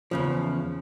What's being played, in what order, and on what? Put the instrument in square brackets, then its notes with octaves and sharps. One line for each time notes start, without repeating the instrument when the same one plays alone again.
[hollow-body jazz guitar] E2 C#3 F3